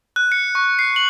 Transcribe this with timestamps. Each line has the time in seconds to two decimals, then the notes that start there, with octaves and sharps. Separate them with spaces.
0.16 F#6
0.32 C#7
0.55 C#6
0.79 C7
0.96 F#7